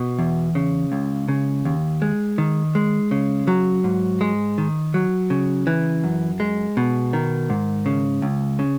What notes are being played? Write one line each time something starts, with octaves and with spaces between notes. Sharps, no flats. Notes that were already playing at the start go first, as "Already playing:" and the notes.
Already playing: B2
E2
C#3
C#2
C#3
D#2
G#3
D#3
G#3
C#3
F#3
G#2
G#3
D#3
F#3
C#3
E3
F#2
G#3
B2
D#3
G#2
C#3
C#2
C#3